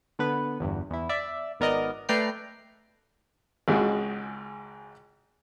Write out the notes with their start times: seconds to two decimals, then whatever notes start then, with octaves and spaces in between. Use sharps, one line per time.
0.19 D3 B3 B4
0.60 G1 E2 G2
0.90 E2 E4
1.09 D5 E5
1.60 G#1 B3 A#4 D5 D#5
2.09 A3 B4 D5 G5 A#5 C7
3.68 G#1 C#2 C#3 G#3 F#4